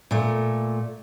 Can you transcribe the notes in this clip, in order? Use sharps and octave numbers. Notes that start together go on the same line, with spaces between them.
A#2 A3